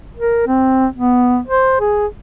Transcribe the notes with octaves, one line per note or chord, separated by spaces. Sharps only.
A#4
C4
B3
C5
G#4